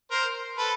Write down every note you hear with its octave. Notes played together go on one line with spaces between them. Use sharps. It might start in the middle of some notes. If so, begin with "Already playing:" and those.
A#4 C5
A4 B4